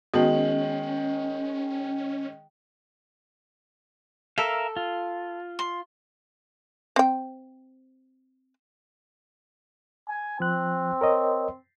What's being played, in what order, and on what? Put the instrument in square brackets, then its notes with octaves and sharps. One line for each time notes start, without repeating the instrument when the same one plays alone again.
[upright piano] D#3 G#3 [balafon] B3 F#4 [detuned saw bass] C#4 [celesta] D#5
[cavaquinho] A4 [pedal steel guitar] A#4 E5 F5
[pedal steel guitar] F4
[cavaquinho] C6
[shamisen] C4 G5
[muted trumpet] G#5
[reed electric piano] F3 F#6 [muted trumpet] C4
[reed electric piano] A#4 C#5 D#5